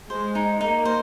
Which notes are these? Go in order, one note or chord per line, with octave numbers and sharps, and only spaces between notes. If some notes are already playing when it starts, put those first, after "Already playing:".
G#3 C5
D#4
A#3 D#4
C5